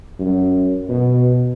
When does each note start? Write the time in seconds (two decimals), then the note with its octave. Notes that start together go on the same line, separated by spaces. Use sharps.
0.19 F#2
0.89 B2